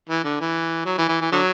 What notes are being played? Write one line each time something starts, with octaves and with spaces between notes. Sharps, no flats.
E3
D3
E3
F#3
E3
E3
E3
D3 F#3